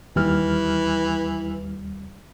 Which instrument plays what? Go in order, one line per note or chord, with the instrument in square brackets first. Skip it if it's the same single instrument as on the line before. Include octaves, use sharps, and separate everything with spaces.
[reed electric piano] D#2 G3 F6 [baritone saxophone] E3